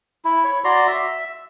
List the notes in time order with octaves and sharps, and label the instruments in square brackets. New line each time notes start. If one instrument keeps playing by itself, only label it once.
[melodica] E4
C#5
F#4 D5 A#5 C6
E5